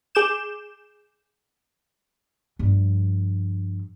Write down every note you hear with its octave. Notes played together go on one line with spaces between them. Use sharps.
G#4 D6 G6 E7
G2 F3